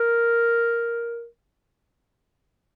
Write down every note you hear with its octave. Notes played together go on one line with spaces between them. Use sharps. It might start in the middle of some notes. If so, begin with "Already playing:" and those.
Already playing: A#4